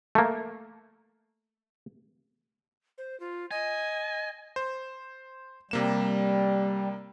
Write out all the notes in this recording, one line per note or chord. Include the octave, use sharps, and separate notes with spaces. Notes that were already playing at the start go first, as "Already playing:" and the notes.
A3 A#3
C5
F4
D#5 G#5
C5
C3 G3 A#3 E7